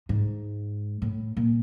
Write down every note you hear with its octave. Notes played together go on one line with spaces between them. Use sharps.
G#2
A2
A#2